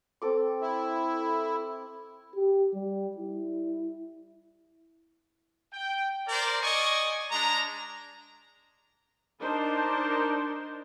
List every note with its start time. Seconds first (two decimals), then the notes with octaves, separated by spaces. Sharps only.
0.22 C4 A4 D6
0.62 E4
2.36 G4
2.74 G3
3.17 E4
5.74 G5
6.28 A#4 C5 D5
6.62 D5 D#5 G#5 C#6
7.31 G#3 D4 A#5
9.42 D4 D#4 A#4 C5 A5